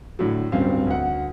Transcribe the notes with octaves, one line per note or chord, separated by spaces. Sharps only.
A2 D3 F#3
D1 G2 C4 C#4 F5
D2 F#5